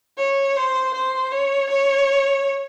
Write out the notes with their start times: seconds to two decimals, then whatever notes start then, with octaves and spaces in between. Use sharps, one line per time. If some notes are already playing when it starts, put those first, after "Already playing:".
0.17 C#5
0.56 C5
0.94 C5
1.32 C#5
1.70 C#5